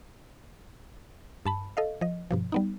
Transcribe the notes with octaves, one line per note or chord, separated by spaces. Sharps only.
G2 A5 B5
A4 D#5 F5
F3 D#5
G2 B2 F3
G3 B3 D#4